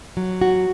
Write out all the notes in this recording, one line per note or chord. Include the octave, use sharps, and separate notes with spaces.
F#3
F#4